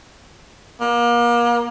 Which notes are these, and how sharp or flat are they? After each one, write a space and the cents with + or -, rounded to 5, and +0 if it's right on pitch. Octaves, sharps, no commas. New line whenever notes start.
A#3 +35